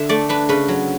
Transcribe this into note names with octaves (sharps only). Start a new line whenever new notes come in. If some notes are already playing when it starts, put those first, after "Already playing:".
Already playing: D3 E5
A3 D5
D4 B4
C#3 B4
F#3